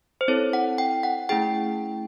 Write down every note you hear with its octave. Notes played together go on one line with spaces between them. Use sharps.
C5
C4 E4 A4 C#5
F#5
G5
F#5
A3 C#4 E4 G#4 G5